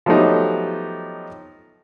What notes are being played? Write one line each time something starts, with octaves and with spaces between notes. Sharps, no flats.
F3 F#3 A3 B3 D#4 G4